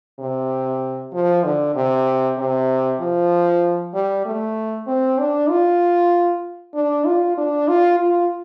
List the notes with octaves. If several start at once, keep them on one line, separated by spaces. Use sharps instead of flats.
C3
F3
D3
C3
C3
F3
G3
A3
C4
D4
F4
D4
F4
D4
F4
F4